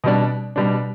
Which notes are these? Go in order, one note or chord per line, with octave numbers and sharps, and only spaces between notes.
B2 G3 D4
B2 G3 D4